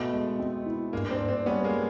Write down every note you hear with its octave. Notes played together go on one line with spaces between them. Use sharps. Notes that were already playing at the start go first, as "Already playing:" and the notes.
Already playing: B2 A3 B3
G#3
C4
E4
G2 G#3 A#3
C4 D4
G2
C4 D4
G3 B3 C#4
G#3 A#3
G3